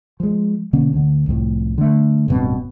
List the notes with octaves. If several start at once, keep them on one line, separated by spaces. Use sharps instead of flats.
F3 G#3
B2 D3 A#3 C#4
D2 D3
C2 F2 A2
D3 A3
D1 G2 B2 C4